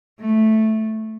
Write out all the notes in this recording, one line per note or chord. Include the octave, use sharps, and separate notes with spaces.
A3